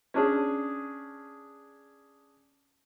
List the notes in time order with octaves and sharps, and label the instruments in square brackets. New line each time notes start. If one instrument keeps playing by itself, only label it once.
[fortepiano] C#4 D4 G#4